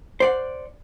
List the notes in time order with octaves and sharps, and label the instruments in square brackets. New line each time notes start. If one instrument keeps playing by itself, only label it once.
[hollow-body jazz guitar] C5 D5 F#5